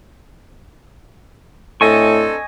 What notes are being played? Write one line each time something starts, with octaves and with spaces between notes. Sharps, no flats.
A2 C4 D4 A4 D#5 G#5 C#6